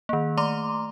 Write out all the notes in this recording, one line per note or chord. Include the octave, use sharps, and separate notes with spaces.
D#3 A#3
A3 A#5 C6 D6